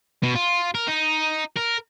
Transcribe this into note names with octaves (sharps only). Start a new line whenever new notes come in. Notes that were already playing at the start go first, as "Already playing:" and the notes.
B2
F4
A#4
D#4
A#4